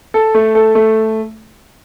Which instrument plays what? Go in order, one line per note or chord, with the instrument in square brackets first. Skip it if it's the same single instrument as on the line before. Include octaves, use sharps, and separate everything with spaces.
[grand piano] A4
A3
A4
A3